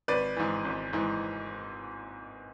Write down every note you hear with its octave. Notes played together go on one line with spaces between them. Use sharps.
G#1 B4 D5
G#2 E3
G#1
G#2 E3